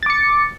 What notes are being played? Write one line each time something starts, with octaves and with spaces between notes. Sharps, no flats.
D6 A6 C#7